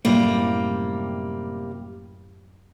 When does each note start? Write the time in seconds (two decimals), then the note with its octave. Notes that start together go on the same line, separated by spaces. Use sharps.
0.05 F#2 A2 C3 G3 A3 A#3